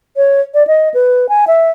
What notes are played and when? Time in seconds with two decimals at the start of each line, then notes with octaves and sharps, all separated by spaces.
0.17 C#5
0.54 D5
0.67 D#5
0.94 B4
1.29 G#5
1.47 E5